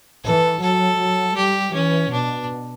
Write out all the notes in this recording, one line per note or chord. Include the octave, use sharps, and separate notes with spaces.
E3 A4
F#3 A4
F#3
G3 G4
E3 C#4
B2 D4